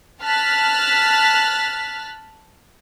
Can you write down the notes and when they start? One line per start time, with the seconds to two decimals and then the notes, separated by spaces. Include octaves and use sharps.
0.22 A5 F6 F#6 A6 B6